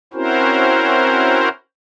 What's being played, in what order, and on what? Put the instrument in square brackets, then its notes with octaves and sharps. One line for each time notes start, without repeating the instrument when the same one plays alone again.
[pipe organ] C4 C#4 E4 F#4 A#4 C5